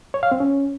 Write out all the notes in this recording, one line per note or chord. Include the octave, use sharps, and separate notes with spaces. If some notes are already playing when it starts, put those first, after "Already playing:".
C#5
F5
C4
C#4